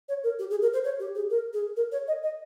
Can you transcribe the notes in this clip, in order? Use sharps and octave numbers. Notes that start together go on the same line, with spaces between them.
C#5
A#4
G4
G#4
A#4
C5
C#5
G4
G#4
A#4
G#4
A#4
C#5
D#5
D#5